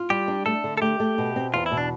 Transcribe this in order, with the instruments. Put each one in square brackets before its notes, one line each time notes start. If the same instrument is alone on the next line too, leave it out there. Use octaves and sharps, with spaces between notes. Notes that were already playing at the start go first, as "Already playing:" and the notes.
Already playing: [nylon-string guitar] F4
[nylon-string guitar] G3 [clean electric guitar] G4
[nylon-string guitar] D4
[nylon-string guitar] A3 [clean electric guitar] A4
[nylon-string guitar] D3
[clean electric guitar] A4
[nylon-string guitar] A3 [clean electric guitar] G4
[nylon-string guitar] A3
B2
C4
[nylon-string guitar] E2 [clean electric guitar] F4
[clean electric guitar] E4
[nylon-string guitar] B2
[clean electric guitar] D4